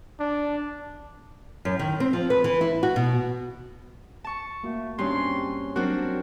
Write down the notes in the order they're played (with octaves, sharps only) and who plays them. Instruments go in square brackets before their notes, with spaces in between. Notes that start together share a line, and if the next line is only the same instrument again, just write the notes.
[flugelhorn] D4
[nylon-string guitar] F#2
D#3
C4
F3
B4
E3
E4
F#4
B2
[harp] A5 C#6
[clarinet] A3 [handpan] A#3 F#4
[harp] G2 [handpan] C4 C#4 C#5 [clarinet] C6
[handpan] F#3 [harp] C4 D4 F#4 [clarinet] A#4